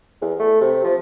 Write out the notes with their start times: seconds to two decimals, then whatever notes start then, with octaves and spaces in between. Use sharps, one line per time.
0.22 E2
0.40 A3
0.61 C3
0.84 F3